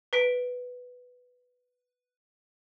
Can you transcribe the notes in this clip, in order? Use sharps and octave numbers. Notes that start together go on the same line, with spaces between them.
B4 B6 D7